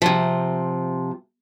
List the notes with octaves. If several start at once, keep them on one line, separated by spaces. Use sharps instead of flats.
C3 F3